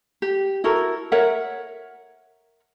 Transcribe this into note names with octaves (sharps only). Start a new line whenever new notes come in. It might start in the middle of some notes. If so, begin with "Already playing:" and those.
G4
E4 F#4 A4 A#4
A#4 C#5 E5 F#5